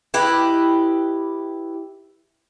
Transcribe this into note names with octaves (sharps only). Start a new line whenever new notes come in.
E4 G4 B4 D#5